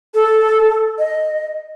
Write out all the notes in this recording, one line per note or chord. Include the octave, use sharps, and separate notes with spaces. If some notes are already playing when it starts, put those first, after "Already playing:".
A4
D#5